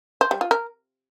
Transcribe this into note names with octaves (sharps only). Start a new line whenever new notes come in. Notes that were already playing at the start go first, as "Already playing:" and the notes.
C5
G3
F4
A#4